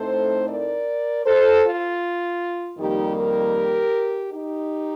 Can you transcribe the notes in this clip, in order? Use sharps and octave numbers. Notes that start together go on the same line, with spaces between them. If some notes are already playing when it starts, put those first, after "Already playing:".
Already playing: A2 A3 C4 D#4 A4 C5
A#4 D5
A4 C5
F4
F2 D#3 G3 A#3 D#4 G4
G4 A#4
D#4 G4